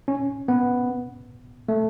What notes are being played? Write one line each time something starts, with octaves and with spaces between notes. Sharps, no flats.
C#4
B3
A3